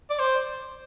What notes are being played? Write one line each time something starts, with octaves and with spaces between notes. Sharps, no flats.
D5
C5